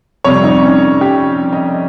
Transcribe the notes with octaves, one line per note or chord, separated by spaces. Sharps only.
F2 C3 G3 C#5
D#4
C#4
G4
D#5